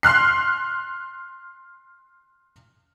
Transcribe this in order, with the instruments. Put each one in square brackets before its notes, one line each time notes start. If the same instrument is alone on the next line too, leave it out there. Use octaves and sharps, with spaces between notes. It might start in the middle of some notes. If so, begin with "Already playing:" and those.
[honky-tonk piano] C6 F6 F#6 C7